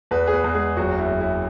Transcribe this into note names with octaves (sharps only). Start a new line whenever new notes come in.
E2 B3 B4
G#4
B3 B4
E2
G#3 G#4
F#1 F#3 F#4
E4
F#1
E4